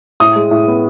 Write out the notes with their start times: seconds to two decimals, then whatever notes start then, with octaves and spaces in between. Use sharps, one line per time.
0.20 A2 D#6
0.36 G#3
0.51 A2
0.67 B3